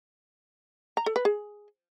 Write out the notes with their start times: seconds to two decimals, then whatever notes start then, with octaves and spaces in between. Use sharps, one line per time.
0.97 A#5
1.06 A4
1.16 B4
1.25 G#4